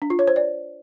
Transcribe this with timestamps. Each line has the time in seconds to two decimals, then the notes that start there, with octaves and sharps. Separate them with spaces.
0.02 D4
0.10 F4
0.19 C#5
0.28 C5
0.36 D5